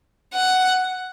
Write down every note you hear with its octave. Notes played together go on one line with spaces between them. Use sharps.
F#5